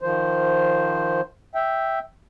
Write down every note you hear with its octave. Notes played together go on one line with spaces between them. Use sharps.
D#3 F3 C5
E5 G5